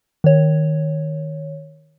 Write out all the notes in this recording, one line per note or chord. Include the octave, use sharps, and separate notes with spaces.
D#3 C#5